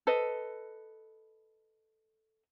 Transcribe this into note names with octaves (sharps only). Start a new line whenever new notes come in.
A4 B4 D#5